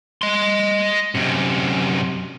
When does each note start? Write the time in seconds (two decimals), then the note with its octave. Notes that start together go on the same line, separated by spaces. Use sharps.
0.22 D#5 C6
1.15 F#2 C3